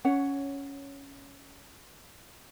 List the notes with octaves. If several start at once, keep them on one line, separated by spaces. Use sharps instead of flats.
C#4 C#5 F#5